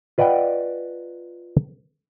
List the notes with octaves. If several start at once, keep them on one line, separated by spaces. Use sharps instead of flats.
F4 B4 D5 D#5 F#5 G5